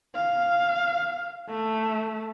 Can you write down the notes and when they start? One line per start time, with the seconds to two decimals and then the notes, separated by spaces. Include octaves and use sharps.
0.15 F5
1.49 A3